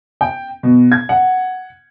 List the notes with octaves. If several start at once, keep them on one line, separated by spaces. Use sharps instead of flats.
G5
B2
G#6
F#5